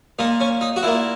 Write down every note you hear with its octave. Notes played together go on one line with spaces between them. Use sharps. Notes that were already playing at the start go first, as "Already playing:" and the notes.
A#2 A#3 D#4
C#4
D#4
F#4
A#2 A#3 E4